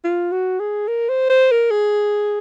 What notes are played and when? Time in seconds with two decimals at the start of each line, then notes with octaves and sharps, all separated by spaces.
0.04 F4
0.32 F#4
0.59 G#4
0.88 A#4
1.09 C5
1.29 C5
1.51 A#4
1.71 G#4